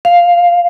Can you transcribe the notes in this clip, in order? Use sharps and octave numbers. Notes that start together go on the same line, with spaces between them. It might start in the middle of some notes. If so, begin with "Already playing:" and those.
F5